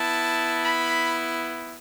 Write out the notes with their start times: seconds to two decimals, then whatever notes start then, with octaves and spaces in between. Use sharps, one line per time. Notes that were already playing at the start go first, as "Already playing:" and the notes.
Already playing: B3 E4 A5
0.65 B5